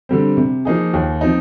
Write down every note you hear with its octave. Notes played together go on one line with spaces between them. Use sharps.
D3 G3 C4
C3
F3 A#3 D#4 G#4
D#2
F3 C4 D#4